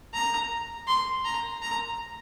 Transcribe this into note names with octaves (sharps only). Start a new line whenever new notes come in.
A#5
C6
A#5
A#5